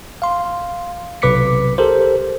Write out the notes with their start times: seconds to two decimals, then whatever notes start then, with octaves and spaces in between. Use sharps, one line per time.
0.22 F5 C6
1.22 B1 C3 B4 D6 B6 C#7
1.78 G4 A4 A#4 C5